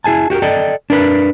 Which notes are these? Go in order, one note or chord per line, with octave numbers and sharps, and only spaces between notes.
E4 G#4 G#5 A5
F#4 G4 A4 A#4
A4 D5 D#5 G5
D4 A#4 B4